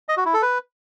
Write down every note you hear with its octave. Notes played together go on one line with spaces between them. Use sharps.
D#5
F#4
E4
A4
B4